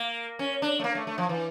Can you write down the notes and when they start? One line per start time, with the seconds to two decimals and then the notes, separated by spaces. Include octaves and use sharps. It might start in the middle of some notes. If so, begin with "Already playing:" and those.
Already playing: A#3
0.39 C#4
0.62 D4
0.79 A3
0.84 A#3
0.95 A3
1.07 A3
1.18 F3
1.29 E3